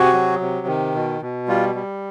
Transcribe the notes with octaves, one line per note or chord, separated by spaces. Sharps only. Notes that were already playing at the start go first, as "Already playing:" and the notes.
Already playing: C3 F#4 G#4
F#3
C3
D#3
B2
B2
G3 F4
G3